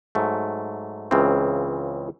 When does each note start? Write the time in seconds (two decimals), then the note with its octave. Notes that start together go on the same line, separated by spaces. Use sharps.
0.15 G#2 F#3 A3
1.11 C#2 C#3 E3 C4